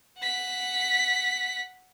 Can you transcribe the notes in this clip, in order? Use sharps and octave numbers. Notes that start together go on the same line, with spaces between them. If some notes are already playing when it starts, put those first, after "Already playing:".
F#5 B6